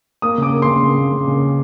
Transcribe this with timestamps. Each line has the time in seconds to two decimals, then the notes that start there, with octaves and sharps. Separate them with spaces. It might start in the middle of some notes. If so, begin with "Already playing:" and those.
0.22 A#3 D#6
0.38 C#3 D6
0.53 A#3
0.62 C#3 C6
0.83 C#3
0.98 A#3
1.12 C#3
1.28 C#3